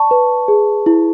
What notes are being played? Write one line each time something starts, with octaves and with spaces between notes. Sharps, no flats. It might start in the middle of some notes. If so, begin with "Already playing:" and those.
Already playing: D5 A5 C#6
B4
G#4
E4